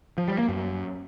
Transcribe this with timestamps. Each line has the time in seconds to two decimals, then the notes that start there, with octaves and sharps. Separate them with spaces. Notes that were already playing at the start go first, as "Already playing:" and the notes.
0.18 F3
0.28 G3
0.38 A#3
0.49 F#2